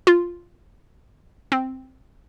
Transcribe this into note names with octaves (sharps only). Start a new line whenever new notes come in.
F4
C4